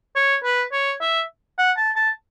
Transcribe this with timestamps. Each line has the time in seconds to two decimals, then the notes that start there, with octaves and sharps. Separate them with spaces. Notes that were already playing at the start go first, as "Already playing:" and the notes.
0.16 C#5
0.44 B4
0.72 C#5
1.01 E5
1.58 F#5
1.77 A5
1.96 A5